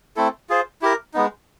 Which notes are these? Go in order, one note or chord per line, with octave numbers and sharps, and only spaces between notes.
A3 C4 E4 A4
F4 G#4 C5
E4 G4 A#4
G#3 B3 D#4